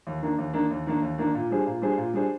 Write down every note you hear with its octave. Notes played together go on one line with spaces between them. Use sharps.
D#2
D#3 A#3 D4
D#2
D#3 A#3 D4
D#2
D#3 A#3 D4
D#2
D#3 A#3 D4
A#2
G3 D4 G#4 C5
A#2
G3 D4 G#4 C5
A#2
G3 D4 G#4 C5